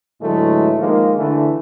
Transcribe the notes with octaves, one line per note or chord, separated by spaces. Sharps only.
A2 D3 E3 F#3 G#3 A3
D#3 F3 G#3 A#3
D3 E3 A3